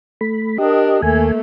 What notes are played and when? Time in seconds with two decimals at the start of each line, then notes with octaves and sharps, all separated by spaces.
0.21 A3 B5
0.58 D4 G4 A#4 D#5
1.02 D#2 A3 A#3 G#5